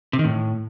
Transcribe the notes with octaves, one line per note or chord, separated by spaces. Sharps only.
C3
D#3
A2